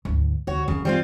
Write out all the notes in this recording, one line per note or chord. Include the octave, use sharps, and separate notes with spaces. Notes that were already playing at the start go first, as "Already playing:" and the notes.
D2 G#2
D2 F#4 C#5
F#2 C#3 E3
G3 C4 F4